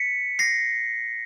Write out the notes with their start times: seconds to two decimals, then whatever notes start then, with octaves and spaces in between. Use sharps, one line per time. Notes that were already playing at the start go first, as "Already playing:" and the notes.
Already playing: B6 C#7
0.39 A#6 C7